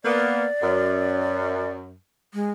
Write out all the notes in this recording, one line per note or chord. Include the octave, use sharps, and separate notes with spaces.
A#3 B3 D5
F#2
G#3